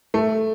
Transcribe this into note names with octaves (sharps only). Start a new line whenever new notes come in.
A3